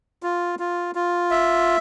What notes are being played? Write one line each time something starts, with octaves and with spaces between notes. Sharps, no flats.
F4
F4
F4
E5